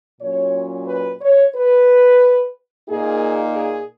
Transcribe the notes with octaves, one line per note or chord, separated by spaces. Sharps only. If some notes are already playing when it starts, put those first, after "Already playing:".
A#2 F#3 C#4 C#5
B4
C#5
B4
A#2 A#3 D#4 G#4
G#4